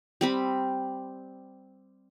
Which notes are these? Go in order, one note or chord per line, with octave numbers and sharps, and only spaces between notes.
G3 C4 B5